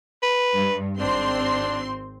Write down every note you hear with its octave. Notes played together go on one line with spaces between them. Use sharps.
B4
G2
G#1 C4 D4 C6